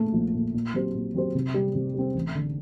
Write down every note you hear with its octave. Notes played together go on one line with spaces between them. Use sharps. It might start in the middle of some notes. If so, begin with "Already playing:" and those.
Already playing: A#2 A3
A#1
A#2 A3
A#2
F#3 C4 G4 C5
A#2
F#3 C4 G4 C5
C3
G3 C4
C3
G3 C4
A1
D3